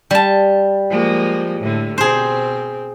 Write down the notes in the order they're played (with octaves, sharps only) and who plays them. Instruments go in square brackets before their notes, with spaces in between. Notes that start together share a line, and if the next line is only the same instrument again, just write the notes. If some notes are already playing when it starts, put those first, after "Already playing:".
[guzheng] G3 A5
[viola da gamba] F3 G#3 A#3
A2 D3
[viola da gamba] B2 C4 [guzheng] G#4 C5